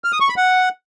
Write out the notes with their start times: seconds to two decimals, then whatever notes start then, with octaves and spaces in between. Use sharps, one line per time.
0.04 F6
0.12 D#6
0.21 C#6
0.29 B5
0.37 F#5